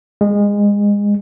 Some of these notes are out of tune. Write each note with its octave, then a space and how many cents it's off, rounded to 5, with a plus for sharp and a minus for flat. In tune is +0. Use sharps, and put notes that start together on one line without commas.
G#3 -25